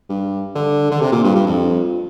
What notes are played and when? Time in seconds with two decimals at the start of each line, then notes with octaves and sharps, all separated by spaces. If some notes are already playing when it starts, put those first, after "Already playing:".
0.09 G2
0.55 D3
0.91 D3
1.00 C3
1.12 A#2
1.24 G2
1.35 G2
1.47 F2